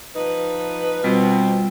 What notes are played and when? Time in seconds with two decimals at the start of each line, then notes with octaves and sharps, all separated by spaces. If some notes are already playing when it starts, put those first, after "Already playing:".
0.16 F3 D#4 B4
1.03 B2 G3 C4 F4